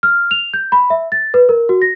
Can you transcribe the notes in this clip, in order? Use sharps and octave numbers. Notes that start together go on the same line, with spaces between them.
F6
F7
G6
B5
E5
A6
B4
A#4
F#4
A#6